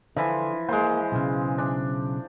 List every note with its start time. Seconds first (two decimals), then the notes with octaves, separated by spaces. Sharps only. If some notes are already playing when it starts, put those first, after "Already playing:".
0.16 D3 E3 F3
0.68 G#3 A#3 C5
1.12 B1 C#3
1.58 D4